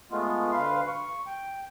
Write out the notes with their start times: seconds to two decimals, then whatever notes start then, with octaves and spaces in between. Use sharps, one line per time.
0.11 G#3 A3 B3 F4
0.52 D2 B4 F5 C6
0.87 C#6
1.27 G5